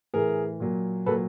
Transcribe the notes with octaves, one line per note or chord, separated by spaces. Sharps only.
A2 E3 G#4 A#4
A#2 F#3
A#2 F#3 A4 B4